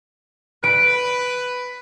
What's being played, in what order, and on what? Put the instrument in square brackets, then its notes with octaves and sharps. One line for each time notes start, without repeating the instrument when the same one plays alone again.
[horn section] B4 [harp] D7